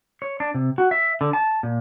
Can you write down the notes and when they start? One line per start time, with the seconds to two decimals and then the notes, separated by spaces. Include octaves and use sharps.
0.22 C#5
0.40 D4
0.54 C3
0.78 F#4
0.91 E5
1.21 D3
1.33 A5
1.63 A#2